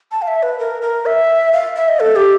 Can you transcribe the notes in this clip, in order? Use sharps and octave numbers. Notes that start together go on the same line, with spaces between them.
A5
F5
E5
B4
A#4
A#4
E5
F5
E5
D#5
A4
G4